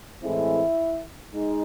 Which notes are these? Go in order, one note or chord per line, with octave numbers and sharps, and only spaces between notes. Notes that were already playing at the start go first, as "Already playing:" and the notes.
A2 E3 G#3 C4 E4
G#3 D#4